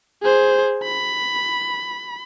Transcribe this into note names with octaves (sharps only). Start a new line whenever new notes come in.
G#4 C5
B5